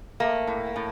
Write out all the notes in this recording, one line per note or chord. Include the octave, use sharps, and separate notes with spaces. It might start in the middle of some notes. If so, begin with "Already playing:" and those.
A3 A#3
A2
A2